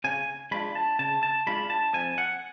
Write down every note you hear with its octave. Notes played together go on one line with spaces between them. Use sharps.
C#3 G#5
G#3 D4 F4 B5
A5
C#3 A5
A5
G#3 D4 F4 B5
A5
F2 G#5
F#5